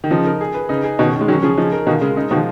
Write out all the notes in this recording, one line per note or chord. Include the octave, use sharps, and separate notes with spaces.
D#3
C#3 F3 D#4
A#4
G#4
B4
C#3 D#4
G#4
B2 D#3 C#4
D#3
G#3
D#3 F#3 C#4
C#3 F3 G#4
C#3 F3 D#4
A#4
B2 D#3 F4
C#3 G#3
C#3 D#4
B2 D#3 F3